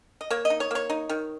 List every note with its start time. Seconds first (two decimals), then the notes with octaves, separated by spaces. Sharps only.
0.21 D#5
0.30 A#3 C#5
0.45 D#5
0.50 D#4
0.60 C#5
0.71 A#3 C#5
0.90 D#4
1.09 D#3